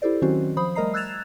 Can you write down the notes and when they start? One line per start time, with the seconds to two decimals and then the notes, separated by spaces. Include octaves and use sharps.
0.02 E4 G4 A4 C5 D5
0.22 D#3 F#3 C4 C#4 F#4 C5
0.57 F3 C5 B5 D#6
0.75 G3 A3 A#4 D#5 A#5 C7
0.94 E6 F#6 G#6 A6 E7 F7